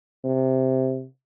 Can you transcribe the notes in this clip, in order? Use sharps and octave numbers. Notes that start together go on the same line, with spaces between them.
C3